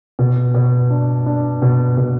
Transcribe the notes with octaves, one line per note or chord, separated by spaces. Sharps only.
B2
B2
D4
D4
B2
B2